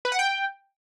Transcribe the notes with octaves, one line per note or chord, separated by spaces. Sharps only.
B4
F#5
G5